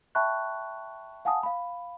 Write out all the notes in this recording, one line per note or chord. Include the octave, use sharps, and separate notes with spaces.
E5 G5 A5 B5 C#6 F#6
F5 F#5 G#5 A5 D#6
F5 B5